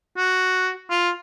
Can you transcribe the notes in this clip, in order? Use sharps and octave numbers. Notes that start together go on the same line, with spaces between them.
F#4
F4